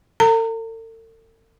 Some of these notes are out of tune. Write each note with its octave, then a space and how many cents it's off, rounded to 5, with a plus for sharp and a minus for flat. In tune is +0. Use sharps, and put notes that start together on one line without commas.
A4 +45 A#5 -35